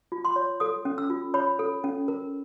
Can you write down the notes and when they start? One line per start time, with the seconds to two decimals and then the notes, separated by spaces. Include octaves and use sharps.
0.12 F4
0.25 C6
0.36 C#5
0.60 A4 D#6
0.85 C#4
0.98 E6
1.10 F4
1.34 C#5 B5
1.59 A4
1.84 C#4
2.08 A#4